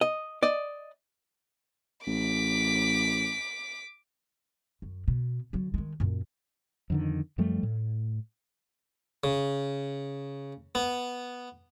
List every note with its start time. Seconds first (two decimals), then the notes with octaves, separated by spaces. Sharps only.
0.01 D#5
0.43 D5 D#5
2.07 A1 D6 B6
4.82 F#2
5.08 B2
5.53 D3 F#3
5.74 D#3 G#3
6.00 F#2 A#2
6.90 F2 D3 D#3
7.38 F#2 F3 G3 A3
7.63 A2
9.24 C#3
10.75 B3